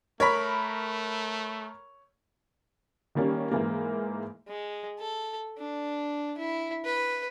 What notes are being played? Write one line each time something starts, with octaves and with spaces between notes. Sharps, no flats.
A3 A#4 C#5 B5 B6
D#3 G3 A#3 C#4
G#2 E3 A#3
G#3
A4
D4
E4
B4